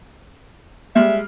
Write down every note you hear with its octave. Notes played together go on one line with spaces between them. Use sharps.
G3 G#3 E5 F6